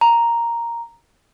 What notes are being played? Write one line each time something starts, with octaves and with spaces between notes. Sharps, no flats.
A#5